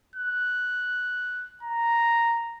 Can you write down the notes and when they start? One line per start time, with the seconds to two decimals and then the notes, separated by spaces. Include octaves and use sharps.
0.16 F#6
1.63 A#5